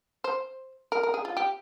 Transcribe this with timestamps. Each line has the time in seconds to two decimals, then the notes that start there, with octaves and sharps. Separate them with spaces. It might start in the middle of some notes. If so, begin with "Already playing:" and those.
0.24 C5
0.92 A#4
1.03 A#4
1.14 G#4
1.25 F4
1.37 G4